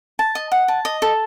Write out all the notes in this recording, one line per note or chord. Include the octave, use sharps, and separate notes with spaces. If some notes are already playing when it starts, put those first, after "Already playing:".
A5
D#5
F#5
A5
D#5
A4